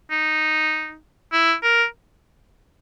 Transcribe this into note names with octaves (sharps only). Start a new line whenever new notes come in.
D#4
E4
A#4